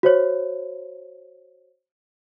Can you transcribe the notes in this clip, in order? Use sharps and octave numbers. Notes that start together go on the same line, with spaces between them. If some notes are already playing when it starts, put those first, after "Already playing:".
F#4 C5 C#5